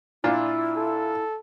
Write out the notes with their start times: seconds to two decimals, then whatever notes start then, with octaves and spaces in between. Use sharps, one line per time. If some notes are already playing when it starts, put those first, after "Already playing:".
0.24 A#2 D4 E4 F4
0.76 A4